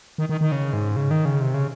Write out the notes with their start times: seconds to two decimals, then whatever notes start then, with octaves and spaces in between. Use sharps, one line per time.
0.18 D#3
0.29 D#3
0.41 D#3
0.52 C#3
0.73 G#2
0.96 C#3
1.11 D#3
1.25 C#3
1.41 C3
1.54 C#3